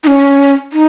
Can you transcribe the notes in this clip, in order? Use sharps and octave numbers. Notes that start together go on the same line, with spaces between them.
D#4
C#4
D#4